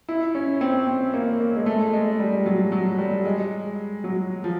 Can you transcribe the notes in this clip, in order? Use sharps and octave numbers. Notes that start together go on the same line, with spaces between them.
E4
C#4
C4
C4
A#3
A#3
G#3
A3
G#3
G3
F#3
F#3
G3
G#3
F#3
F3